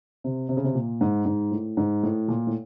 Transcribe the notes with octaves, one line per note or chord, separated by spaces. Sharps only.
C3
C3
C#3
C3
A#2
G#2
G#2
A2
G#2
A2
A#2
A2